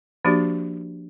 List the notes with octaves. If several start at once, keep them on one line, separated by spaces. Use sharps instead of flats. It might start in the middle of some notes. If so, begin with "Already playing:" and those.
F3 A#3 D4 F#4 G4 D5